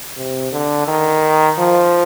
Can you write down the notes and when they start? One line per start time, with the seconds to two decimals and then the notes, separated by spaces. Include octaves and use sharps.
0.17 C3
0.52 D3
0.87 D#3
1.58 F3